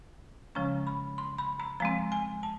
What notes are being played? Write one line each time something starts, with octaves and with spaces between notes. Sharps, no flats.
C#3 F3 G#3 C#4 A#5
B5
C6
B5
A#5
F3 G#3 C4 A#5
G#5
A5